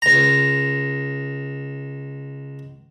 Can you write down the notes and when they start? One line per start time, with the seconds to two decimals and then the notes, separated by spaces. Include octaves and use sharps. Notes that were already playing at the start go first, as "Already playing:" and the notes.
0.02 C#2 A#5